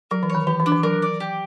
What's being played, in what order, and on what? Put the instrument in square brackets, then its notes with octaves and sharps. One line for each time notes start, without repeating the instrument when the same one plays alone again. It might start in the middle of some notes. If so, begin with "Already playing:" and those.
[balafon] F#3 [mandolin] A#4
[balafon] E3
[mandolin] C#5
[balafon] D#3
[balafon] E3 [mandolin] G4
[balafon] E3
[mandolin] D4
[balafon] E3
[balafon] F#3 [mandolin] A#4
[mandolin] D5
G4